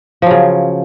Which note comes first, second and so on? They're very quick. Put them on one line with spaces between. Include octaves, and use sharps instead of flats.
F3 F#3 C#3